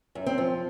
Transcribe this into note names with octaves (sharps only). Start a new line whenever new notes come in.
F#2
C4
F3